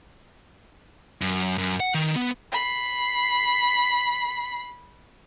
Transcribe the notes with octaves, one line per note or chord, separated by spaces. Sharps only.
F#2
F#2
F#5
D#3
B3
B5 C7